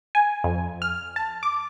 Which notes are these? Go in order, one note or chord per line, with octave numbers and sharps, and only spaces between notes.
G#5
F2
F6
A5
D6